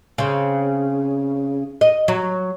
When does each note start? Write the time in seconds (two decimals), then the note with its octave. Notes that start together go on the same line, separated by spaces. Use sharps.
0.18 C#3 C4
1.81 D#5
2.08 F#3